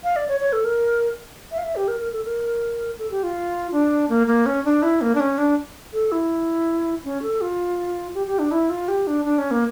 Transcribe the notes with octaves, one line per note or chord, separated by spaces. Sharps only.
F5
D5
C#5
C#5
A4
A#4
E5
F5
E5
G4
A#4
A#4
A4
A#4
A4
G4
F4
D4
A#3
A#3
C#4
D4
E4
A#3
D4
C#4
D4
A4
E4
C#4
A4
F4
G4
G4
D4
E4
F4
G4
D4
D4
C#4
A#3